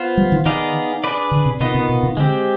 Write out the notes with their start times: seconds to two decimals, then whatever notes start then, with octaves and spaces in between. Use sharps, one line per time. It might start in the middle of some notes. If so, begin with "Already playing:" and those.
Already playing: B3 F4 C5
0.17 G3
0.32 D#3
0.46 D#3 B3 D#4 G#4 D5 F5
1.04 D4 G#4 B4 D5
1.31 D3
1.46 C3
1.60 C3 D#3 B3 F4 B4 D#5
1.75 C3
1.89 B2
2.03 C3
2.17 D3 G#3 C4 G4